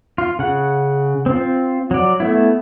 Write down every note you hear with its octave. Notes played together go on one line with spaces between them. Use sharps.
F4
C#3 F#5
C4 F4
F#3 D5
A3 B3 E4